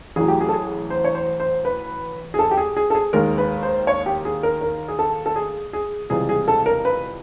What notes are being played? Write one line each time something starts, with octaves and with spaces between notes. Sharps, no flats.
A1 A2 F#3 G#4
G4
G#4
A4
G#4
C5
C#5
C5
C5
B4
G#4
A4
G4
G#4
G#4
A4
G#4
D#2 D#3 G#3 A#4
B4
C5
C#5
G4
G#4
A#4
A#4
G#4
A4
A4
G#4
G#4
C#2 C3 E3 G3 G#4
G#4
A4
A#4
B4